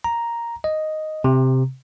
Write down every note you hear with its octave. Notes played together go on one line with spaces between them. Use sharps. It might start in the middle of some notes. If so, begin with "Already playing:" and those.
A#5
D#5
C3